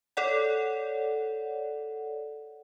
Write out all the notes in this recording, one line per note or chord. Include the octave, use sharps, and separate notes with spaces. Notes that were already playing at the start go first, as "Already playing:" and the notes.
A4 C#5 D5 F#5